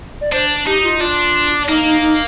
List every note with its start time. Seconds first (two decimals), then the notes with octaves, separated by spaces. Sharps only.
0.21 D5
0.33 D4 C5
0.67 D#4 G4
0.84 F4
1.00 D4 F4
1.68 A#3 D#4
1.85 D#4
2.02 D#4